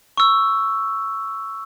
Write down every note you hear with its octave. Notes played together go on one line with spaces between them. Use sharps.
C#6 E6